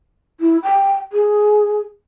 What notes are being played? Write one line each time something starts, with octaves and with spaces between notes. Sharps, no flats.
E4
G5
G#4